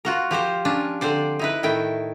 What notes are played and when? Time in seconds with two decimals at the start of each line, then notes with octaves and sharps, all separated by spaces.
0.05 F4 F#4 A#4
0.31 F3 G4 A#4 C5
0.65 C#4 D4 F4
1.01 D3 C4 C5 D5
1.39 D#4 E4 B4
1.63 A2 D#3 E4 G5